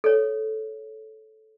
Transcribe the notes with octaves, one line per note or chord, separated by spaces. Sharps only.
A4 C#5